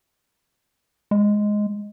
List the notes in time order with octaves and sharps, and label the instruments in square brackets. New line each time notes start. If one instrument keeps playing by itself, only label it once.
[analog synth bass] G#3